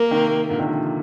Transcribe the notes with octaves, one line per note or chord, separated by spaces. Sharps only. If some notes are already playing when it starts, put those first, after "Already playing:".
Already playing: A#3
C3 D#3
A#2 D3
C3 D#3
D3 F3